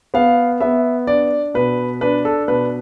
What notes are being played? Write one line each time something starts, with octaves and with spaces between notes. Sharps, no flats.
B3 F5
B3 E5
D4 D5
B2 B4
D4 B4
A4
B2 B4